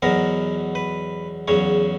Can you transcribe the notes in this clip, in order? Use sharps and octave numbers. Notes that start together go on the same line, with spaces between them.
E2 B2 F#3 B3 A#4
B4
E2 C#3 F#3 C#5